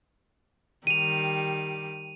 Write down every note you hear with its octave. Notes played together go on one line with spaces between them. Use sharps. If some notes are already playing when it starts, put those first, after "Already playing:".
D#3 G3 G4 D#7 F7